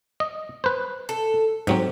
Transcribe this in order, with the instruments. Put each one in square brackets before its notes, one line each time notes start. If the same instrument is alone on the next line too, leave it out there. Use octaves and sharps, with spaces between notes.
[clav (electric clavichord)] D#5
B4 C5
[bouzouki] A4
[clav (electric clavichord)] G#2 F#3 C4 [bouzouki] G4